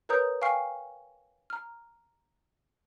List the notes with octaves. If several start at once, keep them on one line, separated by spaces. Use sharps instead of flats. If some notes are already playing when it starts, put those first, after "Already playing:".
A#4 B4 C#5 A#5 D#6 G6
F5 G5 G#5 C#6 F6 C7
A#5 F6